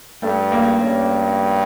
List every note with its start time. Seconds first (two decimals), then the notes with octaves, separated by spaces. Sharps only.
0.22 G2 A3
0.52 A#3
0.81 G2 C#4